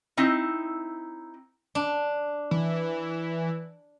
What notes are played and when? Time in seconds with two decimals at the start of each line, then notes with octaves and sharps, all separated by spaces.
0.17 C4 D#4 E4
1.75 D4
2.51 E3